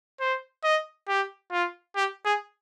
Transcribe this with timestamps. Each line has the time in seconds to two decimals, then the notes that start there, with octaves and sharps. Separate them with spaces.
0.20 C5
0.64 D#5
1.08 G4
1.51 F4
1.96 G4
2.25 G#4